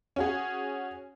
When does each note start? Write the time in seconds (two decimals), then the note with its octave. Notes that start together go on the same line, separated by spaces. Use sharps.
0.16 C#4 F#4 G#4